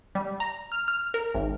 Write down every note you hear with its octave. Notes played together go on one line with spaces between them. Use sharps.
G3
A#5
F6
F6
A#4
G#1